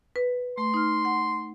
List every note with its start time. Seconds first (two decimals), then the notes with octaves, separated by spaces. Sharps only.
0.16 B4
0.58 A3 C6
0.74 D#4 F6
1.05 F#5